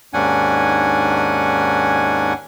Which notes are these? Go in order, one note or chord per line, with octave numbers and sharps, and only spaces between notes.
D#2 G#2 C#4 D4 F#5 G#5